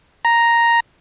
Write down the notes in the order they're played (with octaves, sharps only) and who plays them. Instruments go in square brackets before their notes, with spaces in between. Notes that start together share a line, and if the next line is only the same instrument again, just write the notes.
[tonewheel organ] A#5